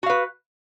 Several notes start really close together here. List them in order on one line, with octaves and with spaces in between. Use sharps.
F#4 F5 B4